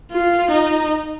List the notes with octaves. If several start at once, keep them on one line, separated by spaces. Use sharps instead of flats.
F4
D#4